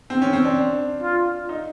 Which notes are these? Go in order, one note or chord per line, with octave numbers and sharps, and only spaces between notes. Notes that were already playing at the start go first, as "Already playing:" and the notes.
C4
C#4
C4
D4
F4
D#4